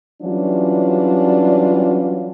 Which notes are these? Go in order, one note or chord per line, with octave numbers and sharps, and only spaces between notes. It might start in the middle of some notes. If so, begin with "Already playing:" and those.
E3 F#3 G3 C#4 D4 F4